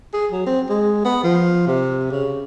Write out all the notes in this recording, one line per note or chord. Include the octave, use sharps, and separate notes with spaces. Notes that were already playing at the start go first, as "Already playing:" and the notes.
G#4
F#3
C4
G#3
B3
F3
C3
C#3